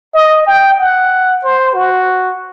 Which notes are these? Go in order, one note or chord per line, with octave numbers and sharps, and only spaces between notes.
D#5
G5
F#5
C5
F#4